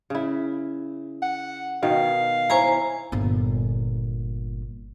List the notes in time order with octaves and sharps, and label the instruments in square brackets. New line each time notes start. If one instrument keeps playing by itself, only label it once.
[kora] C#3 E4
[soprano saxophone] F#5
[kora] B2 D#3 [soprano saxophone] F5
[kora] E4 C#5 [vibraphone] C5 G#5 A#5
[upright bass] G1 A#2